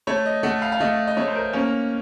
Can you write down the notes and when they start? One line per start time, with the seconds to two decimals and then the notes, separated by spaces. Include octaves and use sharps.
0.07 A3 C#5
0.26 D#5
0.43 A3 F#5
0.62 F5
0.72 F5
0.80 A3 D#5
1.07 D#5
1.17 A3 C#5
1.28 C5
1.35 A#4
1.53 A#3 C#4